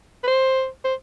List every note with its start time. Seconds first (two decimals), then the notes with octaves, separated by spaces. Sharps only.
0.24 B4
0.28 C5
0.84 C5